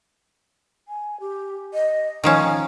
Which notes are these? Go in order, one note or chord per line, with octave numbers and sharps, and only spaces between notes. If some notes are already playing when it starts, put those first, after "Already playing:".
G#5
G4
D#5
D#3 F3 C#4 G#5